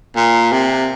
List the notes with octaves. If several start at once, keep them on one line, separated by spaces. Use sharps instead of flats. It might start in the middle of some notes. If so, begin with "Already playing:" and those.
A#2
C3